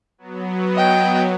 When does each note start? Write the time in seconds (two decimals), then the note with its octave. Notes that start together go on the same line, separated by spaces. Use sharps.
0.18 F#3 B3
0.74 D#5 G5